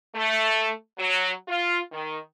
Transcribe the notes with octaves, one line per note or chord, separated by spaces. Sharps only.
A3
F#3
F4
D#3